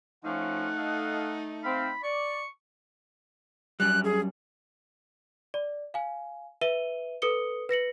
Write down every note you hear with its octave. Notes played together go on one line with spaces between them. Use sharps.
F3 A3 C#4 D#4 F5 F#5
A4 D#5 F5
C4 F5 B5
D5 C#6
F#2 G3 F#6
G#4
D5
F5 G#5
B4 E5 D#7 G7
A4 B4 D#6 C#7 G7
B4 A#6 C#7 F#7